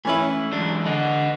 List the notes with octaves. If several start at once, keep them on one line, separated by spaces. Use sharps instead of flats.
E3 A3 C#4 E4 B4
E2 G#2 D4
D3 D#5 F#5